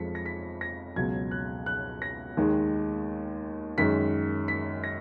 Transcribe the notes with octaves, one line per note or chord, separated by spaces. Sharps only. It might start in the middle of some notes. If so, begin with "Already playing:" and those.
Already playing: F2 F3 G#3 B6 C#7
A#6
B6
A#6
C#2 B2 F#3 G#6
F#6
F#6
A#6
D#2 D#3 G#3
F#2 D#3 G#3 B6
B6
A#6